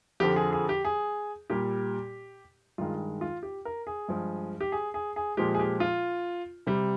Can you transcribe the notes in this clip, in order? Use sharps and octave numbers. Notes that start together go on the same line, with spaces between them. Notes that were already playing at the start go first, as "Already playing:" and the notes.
F2 D3 F3 G4
G#4
G#4
G4
G#4
A#2 G3 G4
G2 D#3 G#3 F4
F4
G4
A#4
G#4
G2 F3 G#3
G4
G#4
G#4
G#4
A#2 F3 G#3 G4
G#4
G4
F4
C3 G3